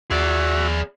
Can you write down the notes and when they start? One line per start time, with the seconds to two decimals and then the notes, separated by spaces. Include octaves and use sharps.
0.11 D#2 F#4 G#4 D5 E5